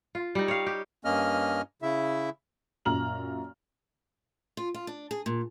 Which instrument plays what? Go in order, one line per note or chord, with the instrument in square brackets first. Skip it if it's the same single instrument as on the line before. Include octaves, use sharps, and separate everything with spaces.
[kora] F4
G3 D#4
C#5 F5
G4
[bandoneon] G2 A#3 C#4 D#5 F6
C#3 E4 E5
[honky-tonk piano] F#2 A#2 A#5 F6 F#7
[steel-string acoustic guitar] F4
F4
D4
G#4
A#2